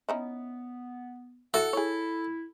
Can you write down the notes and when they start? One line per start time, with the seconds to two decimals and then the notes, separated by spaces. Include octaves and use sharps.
0.09 B3 C#4 D#4 E4
1.54 E4 F#4 A4 F#5
1.73 E4 G#4 C#5